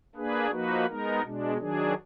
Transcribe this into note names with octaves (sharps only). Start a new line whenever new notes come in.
A#3 D4 G#4 B4
F3 A#3 D#4 F#4 B4
G#3 B3 D#4 A#4
B2 G#3 D4
D#3 F#3 D4 G#4